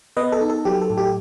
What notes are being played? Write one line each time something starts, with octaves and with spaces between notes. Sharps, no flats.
B3 B4 D#5
A4
D#4
A4
F#3 G4
A4
A2
G4